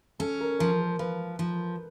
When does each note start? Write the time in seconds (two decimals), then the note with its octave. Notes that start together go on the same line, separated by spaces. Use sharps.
0.19 C#4 A4
0.41 A#4
0.59 F3 A#4
0.80 A#4
0.99 F3 B4
1.39 F3